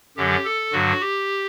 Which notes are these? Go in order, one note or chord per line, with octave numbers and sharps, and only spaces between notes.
F#2 D3 F#3 G4
A4
G2 D3 F#3 F#4
G4